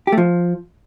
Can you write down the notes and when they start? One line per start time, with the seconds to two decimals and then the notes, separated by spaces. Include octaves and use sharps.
0.07 G4
0.12 A3
0.17 F3